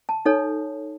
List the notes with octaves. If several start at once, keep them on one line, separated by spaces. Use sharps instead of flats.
A5
D#4 A4 C#5